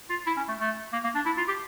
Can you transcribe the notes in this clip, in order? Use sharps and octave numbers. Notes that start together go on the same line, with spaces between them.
F4
E4
C#4
A3
A3
A#3
A#3
D4
E4
F4
G4